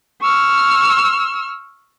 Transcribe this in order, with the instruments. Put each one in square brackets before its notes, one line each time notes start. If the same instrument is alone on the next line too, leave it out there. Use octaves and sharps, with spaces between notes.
[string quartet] C#6 E6 F6